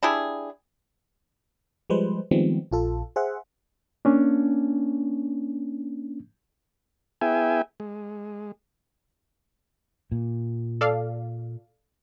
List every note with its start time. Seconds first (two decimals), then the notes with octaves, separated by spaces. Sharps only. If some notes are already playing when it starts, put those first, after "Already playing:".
0.03 D4 E4 G4 G#4
1.90 F3 G3 G#3 B4 C5
2.31 D#3 F3 G3 G#3 B3 C4
2.71 A#1 F4 A4
3.16 G#4 C5 E5 F#5
4.05 A#3 C#4 D4
7.21 B3 E4 G#4 E5 G5 G#5
7.80 G#3
10.12 A#2
10.81 A4 D5 F5